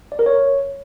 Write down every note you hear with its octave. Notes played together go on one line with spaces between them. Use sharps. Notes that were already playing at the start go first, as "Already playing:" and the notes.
D5
A#4
C#5